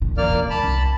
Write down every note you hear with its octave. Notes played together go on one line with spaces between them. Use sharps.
A2
E2 B2 A#3 D5 F6
C#2
A5 B5
C2 D#4